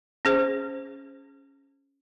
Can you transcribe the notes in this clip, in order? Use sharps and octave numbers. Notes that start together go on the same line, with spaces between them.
C#4 G#4 C5